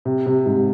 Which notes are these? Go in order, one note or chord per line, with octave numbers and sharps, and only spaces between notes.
C3
C3
G#2